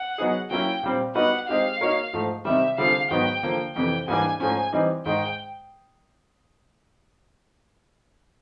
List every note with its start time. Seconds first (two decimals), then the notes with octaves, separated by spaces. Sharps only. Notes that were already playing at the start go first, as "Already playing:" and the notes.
Already playing: F#5
0.18 F#3 B3 D#4 G#4
0.50 F#3 A#3 C#4 E4 G5
0.83 A#2 G3 C4
1.15 G3 B3 D#4 F#4 B4 F#5
1.48 G#3 C4 D#4 G4 F5
1.81 A#3 D#4 F#4 A#4 C#5
2.13 G#2 F3 A3
2.45 C3 D#3 G3 E5
2.78 D3 G3 C4 F4 G#4 F5
3.11 G#2 D#3 F#3 B3 G5
3.43 D3 F3 A#3
3.75 F2 C3 E3 G5
4.08 G#2 E3 G3 A#3 D4 G#5
4.40 G#2 F3 A3 C#4 G#5
4.73 E3 G3 C4 D#4
5.06 G#2 D#3 G#3 G5